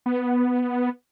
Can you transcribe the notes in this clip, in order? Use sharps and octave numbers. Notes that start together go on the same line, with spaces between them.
B3